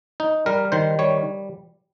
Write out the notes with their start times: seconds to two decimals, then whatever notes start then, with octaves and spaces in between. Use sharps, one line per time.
0.20 D#4
0.46 G3 A#4
0.72 D#3 C5
0.99 G3 C#5